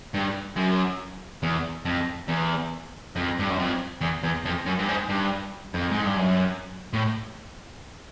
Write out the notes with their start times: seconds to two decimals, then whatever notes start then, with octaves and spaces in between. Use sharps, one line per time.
0.14 G2
0.56 F#2
1.43 E2
1.85 F2
2.28 E2
3.16 F2
3.39 G2
3.49 F#2
3.58 F2
4.01 E2
4.23 E2
4.45 F2
4.66 F#2
4.79 G2
4.88 G#2
5.09 G2
5.74 F2
5.91 G#2
6.05 G2
6.17 F#2
6.93 A2